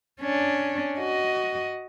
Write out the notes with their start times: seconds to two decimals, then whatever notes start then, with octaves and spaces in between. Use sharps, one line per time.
0.21 C#4 D4
0.99 F#4 D#5